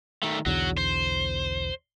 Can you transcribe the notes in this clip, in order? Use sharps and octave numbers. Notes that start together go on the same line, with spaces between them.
D#3 A3
B1 E2 D3 F#3
C5